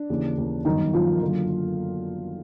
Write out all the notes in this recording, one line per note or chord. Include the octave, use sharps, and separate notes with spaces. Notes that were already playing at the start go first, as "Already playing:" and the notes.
Already playing: D4
D#2 C#3 E3
D#2 C#3 E3
G1 F#2 D#3 D#4
G1 F#2 D#3 F3 F4
F#1 F#2 D3 F3